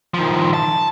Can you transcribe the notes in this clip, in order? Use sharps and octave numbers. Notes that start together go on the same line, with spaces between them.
D#3 F3
A5